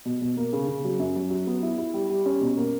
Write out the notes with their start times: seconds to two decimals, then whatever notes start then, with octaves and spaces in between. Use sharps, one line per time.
0.05 B2
0.22 B2
0.37 A#3
0.53 C#3
0.68 C#3
0.84 F#3
1.00 F#2
1.16 F#3
1.30 F#3
1.47 B3
1.63 E4
1.78 E4
1.94 G3
2.10 G3
2.26 C#4
2.41 B2
2.57 A#3